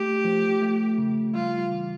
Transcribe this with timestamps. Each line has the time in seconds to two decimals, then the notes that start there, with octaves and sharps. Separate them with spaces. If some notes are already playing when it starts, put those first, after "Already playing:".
Already playing: A3 G4
0.25 F3
0.61 A3
0.98 C#3
1.35 G3 F4
1.71 E3